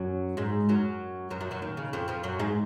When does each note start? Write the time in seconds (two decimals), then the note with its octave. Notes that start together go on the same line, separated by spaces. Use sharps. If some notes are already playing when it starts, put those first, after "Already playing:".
Already playing: F#2 F#3
0.37 G#2 G#3
0.69 F#2 F#3
1.30 F#2 F#3
1.41 F#2 F#3
1.51 F#2 F#3
1.62 D#2 D#3
1.77 C#3
1.93 F2 F3
2.08 F2 F3
2.23 F#2 F#3
2.39 G#2 G#3